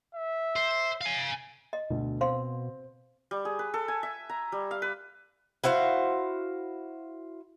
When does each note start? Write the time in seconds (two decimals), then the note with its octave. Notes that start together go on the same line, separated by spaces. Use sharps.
0.15 E5
0.56 C5
1.01 F5 G#5
1.73 D#5
1.90 D2 B2
2.21 C4 C5 F5 C6
3.31 G3
3.45 G#4
3.59 B4
3.74 A4
3.88 G#5
4.03 E5
4.29 A#5
4.52 G3
4.71 F5
4.82 B4
5.64 E4 F#4 C5 F5